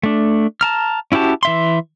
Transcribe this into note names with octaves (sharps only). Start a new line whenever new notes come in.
A3 D4
A5 A#5 F6
C#4 E4 F#4 G4 A5
E3 E5 C6